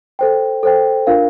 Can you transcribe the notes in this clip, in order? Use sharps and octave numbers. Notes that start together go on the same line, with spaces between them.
A4 C5 G5
A4 C5 G5
D4 F4 A#4 F5